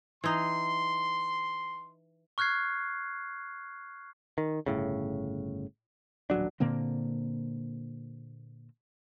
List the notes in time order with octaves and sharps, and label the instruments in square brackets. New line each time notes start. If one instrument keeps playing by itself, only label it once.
[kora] E3 D#4 [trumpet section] C6
[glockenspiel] C#6 F6 F#6 G#6 C7
[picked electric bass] D#3
G1 A2 C#3
D#1 A1 F#3 D4
[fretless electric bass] A#2 D3 A#3 C4